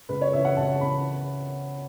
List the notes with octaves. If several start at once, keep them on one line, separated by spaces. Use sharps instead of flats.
C#2 B4
C#5
C#3 E3 E5
F#5
C#2 A5
C#3 E3 B5